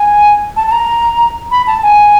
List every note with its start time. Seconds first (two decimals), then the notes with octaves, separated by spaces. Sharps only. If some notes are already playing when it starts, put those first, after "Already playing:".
Already playing: G#5
0.56 A5
0.67 A5
0.72 A#5
1.51 B5
1.67 A5
1.83 G#5